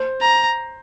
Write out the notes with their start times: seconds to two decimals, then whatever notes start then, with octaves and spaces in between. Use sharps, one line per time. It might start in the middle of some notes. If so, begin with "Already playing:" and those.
Already playing: C5
0.21 A#5